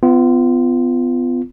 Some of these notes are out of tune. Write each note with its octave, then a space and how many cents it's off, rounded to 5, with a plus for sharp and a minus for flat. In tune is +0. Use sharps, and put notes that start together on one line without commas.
B3 +35 F4 -15